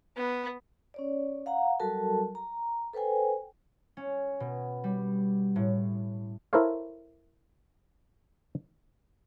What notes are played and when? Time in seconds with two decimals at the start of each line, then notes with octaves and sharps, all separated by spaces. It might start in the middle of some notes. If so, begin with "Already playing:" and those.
0.17 B3
0.94 C#4 C#5 D5
1.46 F5 F#5 A#5
1.80 F#3 G3 F#4 A4 A#4 A5
2.35 A#5
2.93 A4 B4 C5 G5 G#5
3.97 C#4
4.40 B2
4.84 G3
5.56 A2
6.53 E4 A4 A#4 C5 C#5 F5